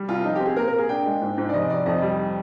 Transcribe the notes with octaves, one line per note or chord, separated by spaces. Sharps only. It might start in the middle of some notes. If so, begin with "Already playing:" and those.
Already playing: G3
C2 F4
F3 D#4
C4 G4
G#4
A#2 A#4
A#4
A#3
G#4
D4 G5
G#3
G#2
G#2
D5
F1 D#5
F1 D5
F2 D#5
G3